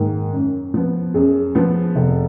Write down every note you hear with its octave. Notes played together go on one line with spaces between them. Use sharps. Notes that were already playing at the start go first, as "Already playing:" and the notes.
Already playing: G#2 D#3 A#3
F#2
F3 B3
F#2 G#4
F3 B3
F1